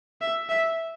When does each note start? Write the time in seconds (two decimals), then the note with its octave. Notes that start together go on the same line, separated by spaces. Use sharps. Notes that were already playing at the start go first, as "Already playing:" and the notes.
0.21 E5
0.49 E5